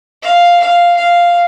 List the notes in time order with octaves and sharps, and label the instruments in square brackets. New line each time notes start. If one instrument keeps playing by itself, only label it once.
[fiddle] F5
F5
F5